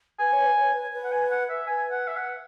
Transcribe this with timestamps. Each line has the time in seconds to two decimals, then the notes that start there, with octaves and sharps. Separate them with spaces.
0.19 B4 G#5
0.33 C#5
0.47 B4
0.60 C#5
0.73 B4
0.93 B4
1.04 F#5
1.12 G#5
1.31 F#5
1.49 E5
1.67 B4 G#5
1.91 F#5
2.08 E5
2.17 F#5